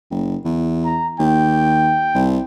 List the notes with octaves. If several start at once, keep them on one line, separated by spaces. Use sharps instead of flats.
F#1
E2
A#5
D#2 G5
C2